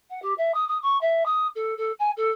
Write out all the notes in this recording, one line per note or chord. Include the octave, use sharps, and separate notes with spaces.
F#5
G4
E5
D#6
D#6
C#6
E5
D#6
A4
A4
G#5
A4